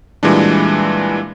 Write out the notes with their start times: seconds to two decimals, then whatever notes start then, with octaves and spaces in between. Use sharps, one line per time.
0.23 A#2 E3 G3 G#3 D4